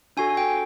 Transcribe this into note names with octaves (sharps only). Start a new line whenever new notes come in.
D4 F#4 A4 G#5
G5